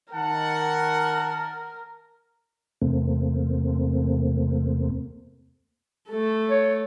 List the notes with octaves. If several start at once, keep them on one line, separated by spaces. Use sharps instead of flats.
D#3 A#4 F#5 A5
E2 C3 A3 A#3 C4
A3 A4
C#5